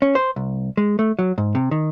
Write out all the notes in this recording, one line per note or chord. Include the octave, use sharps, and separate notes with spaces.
C#4
C5
C2
G#3
A3
F#3
G#2
C3
D#3